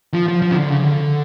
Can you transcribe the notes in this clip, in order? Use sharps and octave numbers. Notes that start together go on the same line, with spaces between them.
F3
F3
F3
C#3
D3
C#3
D3